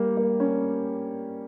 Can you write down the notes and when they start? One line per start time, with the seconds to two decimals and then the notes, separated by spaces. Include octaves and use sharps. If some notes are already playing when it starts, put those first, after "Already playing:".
Already playing: G3 A#3
0.17 A#3
0.40 C#4